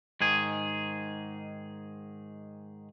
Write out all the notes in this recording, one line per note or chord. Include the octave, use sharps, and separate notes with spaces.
G#2 D#3 G#4